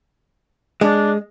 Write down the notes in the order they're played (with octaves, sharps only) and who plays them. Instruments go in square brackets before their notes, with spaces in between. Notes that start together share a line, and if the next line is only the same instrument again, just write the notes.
[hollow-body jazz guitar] G#3 [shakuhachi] D4